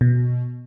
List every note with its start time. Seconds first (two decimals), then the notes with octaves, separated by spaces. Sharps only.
0.01 B2